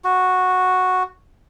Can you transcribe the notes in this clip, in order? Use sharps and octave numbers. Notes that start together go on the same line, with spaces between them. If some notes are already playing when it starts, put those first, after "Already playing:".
F#4